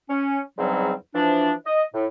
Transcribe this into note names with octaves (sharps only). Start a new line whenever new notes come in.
C#4
E2 G#2 C#3 F#3 G3 C4
E3 F3 D4
D#5
A2